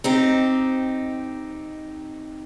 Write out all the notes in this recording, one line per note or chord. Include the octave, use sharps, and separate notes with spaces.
C4 D#4 G4